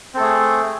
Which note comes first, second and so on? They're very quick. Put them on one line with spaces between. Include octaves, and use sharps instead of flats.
C4 A4 A3 G#4